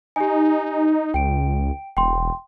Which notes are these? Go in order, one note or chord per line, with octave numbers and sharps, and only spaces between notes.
D#4 G4 G#5
C#2 G5 D7
E1 G5 C6